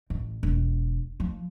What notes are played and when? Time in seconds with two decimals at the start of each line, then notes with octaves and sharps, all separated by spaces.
0.10 A1
0.43 E1
1.20 F3